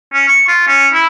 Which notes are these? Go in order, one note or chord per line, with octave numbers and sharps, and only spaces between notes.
C#4
C#6
F4
C#4
E4